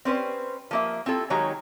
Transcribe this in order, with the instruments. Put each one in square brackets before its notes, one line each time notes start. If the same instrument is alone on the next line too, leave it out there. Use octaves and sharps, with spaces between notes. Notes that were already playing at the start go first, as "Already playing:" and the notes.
[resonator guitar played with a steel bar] C4 C#4 B4 C5
F3 A#3 E5
C4 E4 F4 A4
D#3 F#3 G#3 G4 C#5 A#5